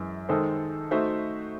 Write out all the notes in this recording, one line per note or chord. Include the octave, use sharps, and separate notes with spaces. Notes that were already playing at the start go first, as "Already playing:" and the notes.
Already playing: F#2 E3 G#3
D#3 G#3 D#4 A4 C5
A3 D#4 F#4 C5 E5